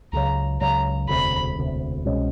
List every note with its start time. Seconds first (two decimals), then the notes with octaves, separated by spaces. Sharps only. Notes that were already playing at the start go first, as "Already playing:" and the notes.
0.13 C#2 C#3 F#3 A#5
0.61 C#2 C#3 F#3 A#5
1.09 E1 D2 C3 B5
1.57 E1 D2 C3
2.05 C2 B2 G#3 C#4